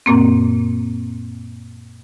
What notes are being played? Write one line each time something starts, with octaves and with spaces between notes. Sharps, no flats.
F#2 A#2 A#3 C4